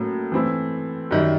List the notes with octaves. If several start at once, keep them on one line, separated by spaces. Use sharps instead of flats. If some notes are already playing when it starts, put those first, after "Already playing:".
Already playing: A2 F#3 A#3 C#4
E3 A3 C4 E4
F#2 D#3 G3